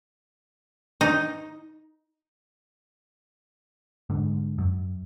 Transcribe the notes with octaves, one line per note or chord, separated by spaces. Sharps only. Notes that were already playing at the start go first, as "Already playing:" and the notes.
D#4
G#2 D3
F#2